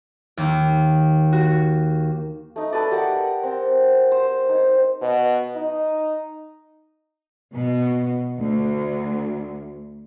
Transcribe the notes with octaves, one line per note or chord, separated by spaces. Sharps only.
D#2
F#4
A3 D#4
A4 B4 D5
G4 A#4 F#5
C4
C5
D#4
B2
D#4
B2
D2